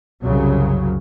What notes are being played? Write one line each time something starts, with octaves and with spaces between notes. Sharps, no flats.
C2 F#2 C#3 F#3